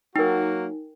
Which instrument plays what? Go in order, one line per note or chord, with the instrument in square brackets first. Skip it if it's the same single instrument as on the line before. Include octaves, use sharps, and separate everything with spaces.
[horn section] F#3 A#3 F#4 [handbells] D#4 [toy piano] A#4 G5